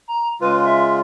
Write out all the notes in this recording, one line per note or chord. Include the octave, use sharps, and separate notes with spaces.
A#5
C#3 G#3 F4 B4
E5